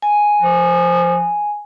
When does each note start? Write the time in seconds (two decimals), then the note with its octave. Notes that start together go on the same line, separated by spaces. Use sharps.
0.02 G#5
0.41 F3